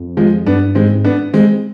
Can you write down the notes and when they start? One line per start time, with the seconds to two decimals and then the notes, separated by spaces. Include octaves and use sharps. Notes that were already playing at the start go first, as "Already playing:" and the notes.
Already playing: F2
0.17 F3 G#3
0.46 G2 B3 D4
0.75 G#2 G#3 C4
1.04 B3 D4
1.34 G#3 C4